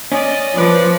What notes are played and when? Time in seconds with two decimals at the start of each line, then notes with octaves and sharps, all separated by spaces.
0.12 C#4 D5 D#5
0.55 F3 B4 D5